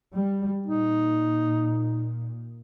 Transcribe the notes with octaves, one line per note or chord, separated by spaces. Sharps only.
G3
A#2 D#4